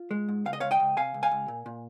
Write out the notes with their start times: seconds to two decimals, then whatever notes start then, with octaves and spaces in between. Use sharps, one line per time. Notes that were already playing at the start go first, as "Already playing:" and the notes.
Already playing: F4
0.11 G#3
0.28 G#2
0.46 C#2 F5
0.53 D#5
0.60 C#2 C#5 F5
0.71 D#5 G5
0.80 C#2
0.97 C3 F5 G#5
1.14 C#2
1.23 F5 G#5
1.31 C#2
1.48 A#2
1.66 A#2